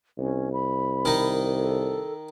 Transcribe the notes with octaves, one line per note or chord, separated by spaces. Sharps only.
C2 C#4
B5
D#3 D#4
A4